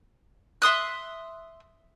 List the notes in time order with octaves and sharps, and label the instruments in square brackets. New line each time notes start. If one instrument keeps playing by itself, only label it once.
[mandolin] E5 C6 D#6 F#6